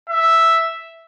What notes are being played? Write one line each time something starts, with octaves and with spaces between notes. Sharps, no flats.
E5